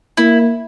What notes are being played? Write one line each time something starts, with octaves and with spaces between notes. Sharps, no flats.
A#3 E4